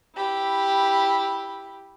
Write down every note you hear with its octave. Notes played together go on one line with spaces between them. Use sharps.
E4 G4 B5